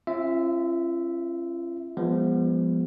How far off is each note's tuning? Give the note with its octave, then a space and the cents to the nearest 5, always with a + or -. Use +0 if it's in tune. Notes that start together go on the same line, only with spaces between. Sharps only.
C#4 -45 F4 -40 E5 -5
F3 +0 G#3 -35 B3 -10